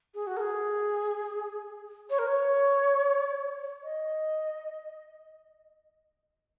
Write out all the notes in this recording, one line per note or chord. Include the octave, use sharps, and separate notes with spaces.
G#4
F#4
A#4
G#4
C#5
A#4
C#5
D#5